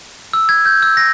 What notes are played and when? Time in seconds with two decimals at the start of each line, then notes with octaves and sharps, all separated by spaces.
0.33 E6
0.49 G#6
0.66 G6
0.82 E6
0.97 A#6